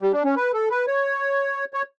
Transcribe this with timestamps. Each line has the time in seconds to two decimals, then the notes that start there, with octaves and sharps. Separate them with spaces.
0.02 G3
0.13 D4
0.24 C#4
0.36 B4
0.53 A4
0.70 B4
0.87 C#5
1.74 C#5